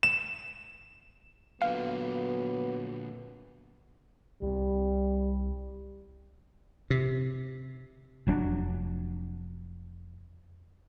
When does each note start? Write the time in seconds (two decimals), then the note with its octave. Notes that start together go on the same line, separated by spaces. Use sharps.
0.03 E7
1.62 A#2 D3 F#3 B3 F5
4.42 C2 G3 C4
6.90 C3
8.27 F1 F#3 C4 D4